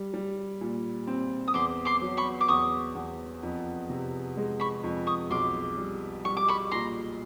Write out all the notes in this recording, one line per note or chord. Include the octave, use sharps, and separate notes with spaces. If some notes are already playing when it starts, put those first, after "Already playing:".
Already playing: G3
G3
A#2
C4
D#6
E2 C6 D6
C6 D6
F#3
B5 C#6
D6
E2 C#6 D#6
E2
F2
C3
G#3
B5 C#6
F2
C#6 D#6
B1 C6 D6
G3
G3 C#6
D6
B5 C#6
A#2 A#5 C6